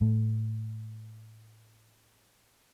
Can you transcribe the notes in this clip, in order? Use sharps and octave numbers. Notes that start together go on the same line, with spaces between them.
A2 A3